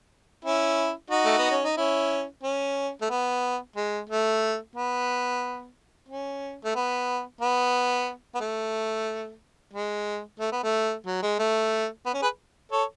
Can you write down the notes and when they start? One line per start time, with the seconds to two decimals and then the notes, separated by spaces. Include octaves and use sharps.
0.45 C#4 E4
1.11 D#4 F#4
1.25 A3
1.38 B3
1.51 C#4
1.64 D#4
1.77 C#4 E4
2.43 C#4
3.01 A3
3.10 B3
3.76 G#3
4.09 A3
4.76 B3
6.08 C#4
6.65 A3
6.75 B3
7.41 B3
8.35 B3
8.40 A3
9.73 G#3
10.39 A3
10.52 B3
10.63 A3
11.06 F#3
11.22 G#3
11.39 A3
12.06 B3
12.13 C#4
12.22 G#4 B4
12.72 A4 C#5